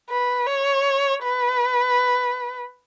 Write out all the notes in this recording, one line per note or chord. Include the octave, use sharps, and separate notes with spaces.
B4
C#5
B4